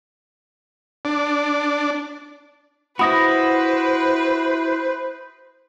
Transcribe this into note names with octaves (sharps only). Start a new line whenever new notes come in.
D4
E4 F#4 B4 C5 B5 D#6 A#6